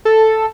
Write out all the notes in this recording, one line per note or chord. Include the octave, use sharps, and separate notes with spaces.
A4